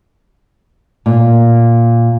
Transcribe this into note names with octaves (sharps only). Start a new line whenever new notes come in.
A#2